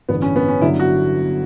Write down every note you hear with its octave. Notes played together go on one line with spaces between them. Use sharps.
A1 G2 D3 G3 B3
C#4
B3
C#4
G1 G2 D3 F#3 E4
F#4